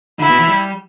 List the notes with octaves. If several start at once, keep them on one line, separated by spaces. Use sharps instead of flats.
D3 E4
B2
E3
G3